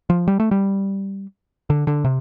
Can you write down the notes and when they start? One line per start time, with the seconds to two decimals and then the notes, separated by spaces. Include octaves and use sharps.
0.10 F3
0.28 G3
0.40 A3
0.51 G3
1.70 D3
1.87 D3
2.04 C3